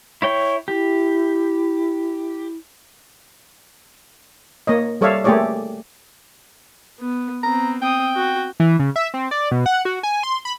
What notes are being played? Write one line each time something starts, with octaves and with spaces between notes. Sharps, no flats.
E4 C#5 G5
E4 G4
A#3 C#5 D#5
G3 A4 C#5 D5 E5 F5
A3 A#3 G4 G#4 C#5 D5
B3
B3 C4 A#5
C4 G5 D#6
F#4
E3
C#3
E5
C4
D5
B2
F#5
F#4
G#5
C6
B5